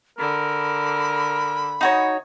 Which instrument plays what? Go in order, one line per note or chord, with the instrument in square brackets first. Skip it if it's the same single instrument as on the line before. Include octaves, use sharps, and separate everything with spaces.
[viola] D3 [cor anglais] A#4 [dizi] B5
[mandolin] D#4 F#4 C#5